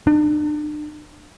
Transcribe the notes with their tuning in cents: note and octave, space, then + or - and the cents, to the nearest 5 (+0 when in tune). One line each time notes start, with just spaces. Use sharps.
D4 +40